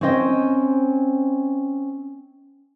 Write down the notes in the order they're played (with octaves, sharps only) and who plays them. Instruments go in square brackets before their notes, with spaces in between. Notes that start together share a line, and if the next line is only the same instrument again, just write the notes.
[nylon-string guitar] C4 C#4 C5 D#5 E5 G5